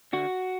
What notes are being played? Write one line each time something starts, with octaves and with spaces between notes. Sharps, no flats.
D3 F#4